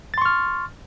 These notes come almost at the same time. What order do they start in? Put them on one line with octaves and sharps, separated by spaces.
A6 C6 C#6 F6